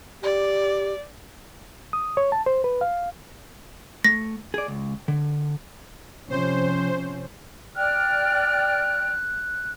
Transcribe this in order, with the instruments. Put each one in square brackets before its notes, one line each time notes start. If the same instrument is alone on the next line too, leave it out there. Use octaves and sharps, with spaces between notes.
[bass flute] G4 [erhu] D5
[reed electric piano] D#6
C#5
A5
C5
B4
F5
[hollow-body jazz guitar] A3 [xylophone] A#6
[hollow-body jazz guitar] G#4 D5
C#2
D3
[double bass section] C3 F3 C#4 [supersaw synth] C5
[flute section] D5 G5 F6 [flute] F#6